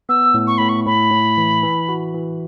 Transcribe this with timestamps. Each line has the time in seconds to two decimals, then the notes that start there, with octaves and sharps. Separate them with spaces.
0.09 B3 E6
0.34 A2
0.47 C#6
0.58 A2 B5
0.69 C#6
0.86 A2 B5
1.11 A2
1.37 E3
1.63 E3
1.89 F#4
2.15 E3